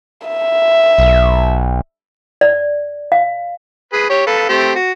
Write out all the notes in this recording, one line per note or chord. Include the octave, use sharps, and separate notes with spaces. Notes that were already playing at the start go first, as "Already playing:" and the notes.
E5
B1
D5
F5
G#4 B4
G4 C#5
A4 B4 F5
A3 C4 G4
F#4